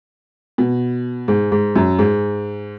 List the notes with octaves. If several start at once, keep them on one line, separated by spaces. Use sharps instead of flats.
B2
G#2
G#2
F#2
G#2